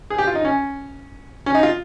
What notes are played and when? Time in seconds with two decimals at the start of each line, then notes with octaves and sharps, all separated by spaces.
0.10 G#4
0.18 G4
0.27 F4
0.35 D#4
0.45 C#4
1.46 C#4
1.55 D#4
1.63 F4